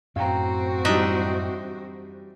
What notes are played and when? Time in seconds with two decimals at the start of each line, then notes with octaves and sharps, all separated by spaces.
0.16 F#2 A2 C4 F#4 F5 G5 A#5
0.85 E3 G3 D4 D#4 E5